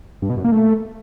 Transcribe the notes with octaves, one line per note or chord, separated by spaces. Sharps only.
G2
B2
F#2
A#3
A3